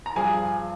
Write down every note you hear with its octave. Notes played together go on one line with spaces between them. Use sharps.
A#5
G2 F3 G#4 G#5